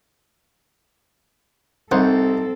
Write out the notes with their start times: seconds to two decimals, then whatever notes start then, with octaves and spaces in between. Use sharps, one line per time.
1.91 C2 C4 D#4 A4 C5 F#5